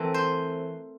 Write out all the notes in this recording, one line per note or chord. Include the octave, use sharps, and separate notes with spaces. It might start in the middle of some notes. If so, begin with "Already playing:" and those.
Already playing: E3 A3 C4 A#4
C5